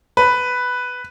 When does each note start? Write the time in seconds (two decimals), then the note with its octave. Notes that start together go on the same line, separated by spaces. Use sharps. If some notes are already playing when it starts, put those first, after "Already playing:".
0.17 B4